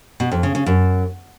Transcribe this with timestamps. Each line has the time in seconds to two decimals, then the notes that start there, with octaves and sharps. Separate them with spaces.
0.20 B2
0.32 F2
0.43 C#3
0.55 C#3
0.66 F#2